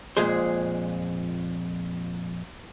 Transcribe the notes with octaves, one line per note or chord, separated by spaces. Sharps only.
F2 A#2 G#3 G#4 C5